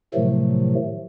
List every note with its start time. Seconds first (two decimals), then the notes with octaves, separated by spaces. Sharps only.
0.14 A2 C3 D#3 F3 F#3 A3